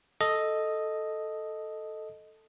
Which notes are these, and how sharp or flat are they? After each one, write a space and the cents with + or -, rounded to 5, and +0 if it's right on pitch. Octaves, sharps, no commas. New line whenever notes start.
A4 +0 D#5 +0